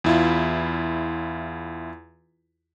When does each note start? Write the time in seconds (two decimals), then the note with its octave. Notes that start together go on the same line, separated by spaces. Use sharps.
0.04 E2 E4 F4